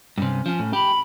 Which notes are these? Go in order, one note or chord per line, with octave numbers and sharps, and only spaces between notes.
G2 C3 C#4
F3 C#4
A2
G4 B5